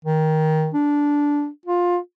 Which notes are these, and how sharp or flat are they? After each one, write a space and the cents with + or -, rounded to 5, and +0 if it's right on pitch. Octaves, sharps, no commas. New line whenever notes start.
D#3 +10
D4 -10
F4 +15